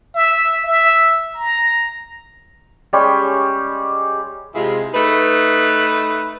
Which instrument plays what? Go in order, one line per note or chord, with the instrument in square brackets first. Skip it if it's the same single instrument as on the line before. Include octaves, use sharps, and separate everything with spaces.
[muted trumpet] E5
E5
A#5
[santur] G3 G#3 C#4 G4
[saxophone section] C3 G#3 E4 F4 G#4
A3 D#4 B4